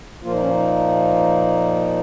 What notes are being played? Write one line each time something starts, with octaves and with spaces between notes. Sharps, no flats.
A#2 F3 A#3 F4
D#4
C#4
D#4